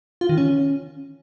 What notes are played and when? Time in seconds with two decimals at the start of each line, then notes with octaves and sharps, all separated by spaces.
0.21 F4
0.29 D#3
0.38 C#4